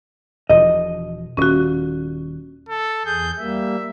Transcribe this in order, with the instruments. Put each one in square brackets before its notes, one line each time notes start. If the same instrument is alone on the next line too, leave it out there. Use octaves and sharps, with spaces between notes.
[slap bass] E1 F3 [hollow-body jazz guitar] D#5
[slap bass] D#1 [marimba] C#4 F#4
[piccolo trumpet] A4
[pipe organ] E2 G6 [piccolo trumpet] G#4
[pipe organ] G3 A#3 [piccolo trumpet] E5